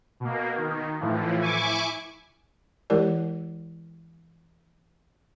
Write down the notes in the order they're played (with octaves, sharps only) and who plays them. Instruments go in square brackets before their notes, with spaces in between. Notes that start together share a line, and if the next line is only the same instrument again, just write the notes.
[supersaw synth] B2 A#3
D#3
A2 E3 F3
E4 G#5 C#6 D6
[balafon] E3 G#3 E4 G4 A#4 D5